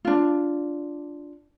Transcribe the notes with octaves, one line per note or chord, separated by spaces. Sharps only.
D4 F4